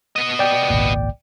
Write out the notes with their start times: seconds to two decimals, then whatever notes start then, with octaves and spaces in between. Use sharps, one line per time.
0.16 B3 D#5
0.39 D5 G5
0.70 G#1 C#2 A#2